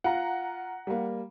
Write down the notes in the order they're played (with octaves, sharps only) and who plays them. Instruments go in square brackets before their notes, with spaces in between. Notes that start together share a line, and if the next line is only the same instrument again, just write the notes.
[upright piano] F4 [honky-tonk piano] F#5 A#5
[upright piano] G3 A#3